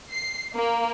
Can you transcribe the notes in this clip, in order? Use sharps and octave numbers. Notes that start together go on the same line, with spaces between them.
C7
A#3